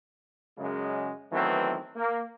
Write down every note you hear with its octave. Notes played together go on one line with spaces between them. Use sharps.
F#2 C#3 G#3
D#3 E3 F#3 A3 B3 C4
A#3